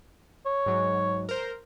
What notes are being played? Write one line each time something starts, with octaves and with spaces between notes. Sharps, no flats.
C#5
G#2 F#3
A#4 C5